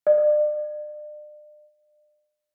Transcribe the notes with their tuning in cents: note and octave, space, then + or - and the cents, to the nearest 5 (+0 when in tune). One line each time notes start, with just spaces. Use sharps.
D5 +40